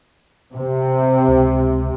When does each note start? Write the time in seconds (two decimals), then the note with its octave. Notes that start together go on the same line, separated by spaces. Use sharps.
0.55 C3
1.28 C#2